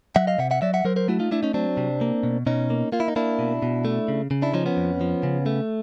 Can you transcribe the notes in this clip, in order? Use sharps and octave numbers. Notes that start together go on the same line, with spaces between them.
F#3 E5 F#5
D#5 F5
C3 E5 F#5
E5 F#5
F#3 D5 E5
E5 F#5
F#3 A#4 C5
A#4 C5
A3 E4 F#4
D#4 F4
A3 D4 E4
C#4 D#4
F#3 C4 D4
C3
A#3
B2
B2 C#4 D#4
A#3
A#3 F4
E4
D#4
A#3 D4 E4
B2
B2
A3
C#3
C#3
D4 E4
F3 C#4 D#4
B3 C#4
F2
F3
C#3
A3